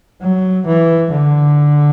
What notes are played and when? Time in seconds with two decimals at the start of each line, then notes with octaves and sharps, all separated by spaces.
0.22 F#3
0.66 E3
1.11 D3